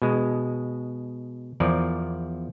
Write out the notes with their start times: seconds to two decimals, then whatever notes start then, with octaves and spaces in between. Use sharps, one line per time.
0.02 B2 G#3
1.60 E2 F3 A#4 D5